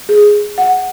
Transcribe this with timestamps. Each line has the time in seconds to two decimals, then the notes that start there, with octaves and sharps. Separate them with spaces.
0.09 G#4
0.58 F#5